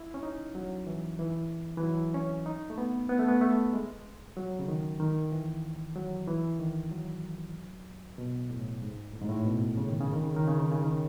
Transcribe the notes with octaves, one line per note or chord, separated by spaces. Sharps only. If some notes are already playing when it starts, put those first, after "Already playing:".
Already playing: E4
C#4
D#4
F#3
E3
E3
E3
F#3
C#4
D#4
A3
B3
B3
A3
B3
A3
G#3
F#3
C#3
D#3
D#3
E3
F#3
E3
D#3
F#3
B2
A2
G#2
A2
G#2
A2
B2
C#3
D#3
C#3
D#3
C#3
D#3
C#3
D#3
C#3
D#3